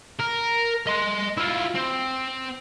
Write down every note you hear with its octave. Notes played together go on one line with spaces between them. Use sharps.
A#4
D#5 C6
E4 F4
C4